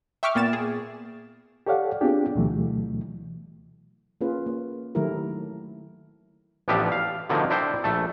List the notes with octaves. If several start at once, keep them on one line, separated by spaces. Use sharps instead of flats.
E5 G5 C#6 D6 F6
A#2 A#3 B3 A6 E7
G#4
G4 A4 C#5 D5 F5 F#5
B3 C4 D4 F4 G4 G#4
D2 B2 E3 F#3 A3
A#3 C#4 F4 G#4 B4
A#3
D#3 F#3 A3 E4 G4 A#4
A1 F3 B3 D4 G4 E5
F5
B2 D3 D#3 F3 A3 A#3
D4 E4 C5 G5
A#1 A3 A4